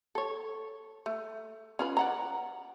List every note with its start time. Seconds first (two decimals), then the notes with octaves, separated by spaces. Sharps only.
0.15 A4 C#5
1.06 A3
1.79 C#4 F4 B4
1.97 D5 F#5 A#5